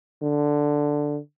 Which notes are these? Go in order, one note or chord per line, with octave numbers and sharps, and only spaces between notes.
D3